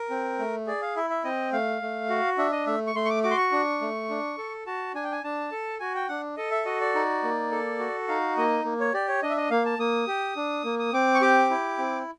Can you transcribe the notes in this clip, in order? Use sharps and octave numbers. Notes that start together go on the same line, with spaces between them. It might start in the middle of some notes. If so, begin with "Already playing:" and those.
Already playing: A#4
C4
A3
G#4 D5
F5
E4 E5
E5
C4 D#5
A3 F5
A3
F#4
D4 E5
D#5
A3 E5
C#6
A3 C6
C#6
D6
F#4 D6
C6
C#6
D4
A3
D4
A4
F#4 A5
D4 G#5
G5
G#5
D4 A5
A4
F#4 G#5
G5
D4 F#5
A4 D#5
E5
F#4 D#5
D5
D#4
A#3
A4
F#4
D#4 F5
A#3 D#5
A#3
C#5
G4 D5
C#5
D4 D#5
E5
D#5
A#3 F5
A5
A#3 D#6
G4
D4
A#3
D#6
C4 D6
C#6
G4 D6
E4
C4